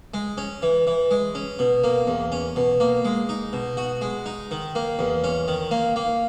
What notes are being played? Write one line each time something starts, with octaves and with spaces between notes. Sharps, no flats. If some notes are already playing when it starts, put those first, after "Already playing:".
G#3
C#4
E3
E3
G#3
C#4
B2
A#3
E2
C#4
B2
A#3
G#3
D#4
B2
F#4
G#3
D#4
D#3
A#3
E2
C#4
D#3
A#3
A#3